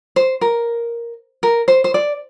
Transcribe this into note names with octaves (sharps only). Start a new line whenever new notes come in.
C5
A#4
A#4
C5
C5
D5